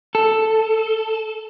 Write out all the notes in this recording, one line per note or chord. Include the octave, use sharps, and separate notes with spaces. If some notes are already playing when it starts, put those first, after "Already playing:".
A4